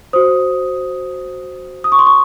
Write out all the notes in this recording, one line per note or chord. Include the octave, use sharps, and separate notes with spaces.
F#4 C5 D#6
D#6
C#6
C6
C#6